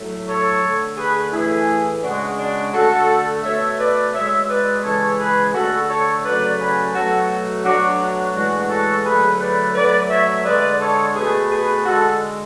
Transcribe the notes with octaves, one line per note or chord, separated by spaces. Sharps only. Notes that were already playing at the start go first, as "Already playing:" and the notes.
Already playing: A2 F#3 A3
A4 C#5
D3 A3
G#4 B4
A2 E3 A3 E4 G#4
C#3 G#3 D4 F#4
D4 F#4
D3 A3 F#4 A4
B2 A3 C#5 E5
B4 D5
B2 G#3 C#5 E5
B4 D5
C#3 E3 G#3 A4 C#5
G#4 B4
D3 A3 F#4 A4
A4 C#5
C#3 F#3 A3 B4 D5
G#4 B4
B2 F#3 A3 F#4 A4
B2 F#3 A3 D4 F#4
D4 F#4
A2 E3 G#3 D4 F#4
F#4 A4
D3 F#3 A3 G#4 B4
B4 D5
B2 F#3 A3 B4 D5
C#5 E5
D3 G#3 B4 D5
A4 C#5
B2 A3 G#4 B4
G#4 B4
D3 G#3 F#4 A4